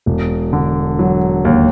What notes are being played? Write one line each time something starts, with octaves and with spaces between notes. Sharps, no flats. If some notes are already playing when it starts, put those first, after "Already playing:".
E1
D3
F#3
D#2